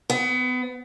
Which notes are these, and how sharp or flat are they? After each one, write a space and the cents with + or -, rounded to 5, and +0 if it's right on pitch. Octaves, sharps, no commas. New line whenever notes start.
B3 +30